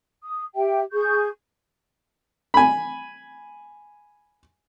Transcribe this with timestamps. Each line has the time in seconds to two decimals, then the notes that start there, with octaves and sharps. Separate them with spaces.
0.24 D#6
0.55 G4 E5 G5
0.92 G#4 C#6 G6
2.54 G#5 B5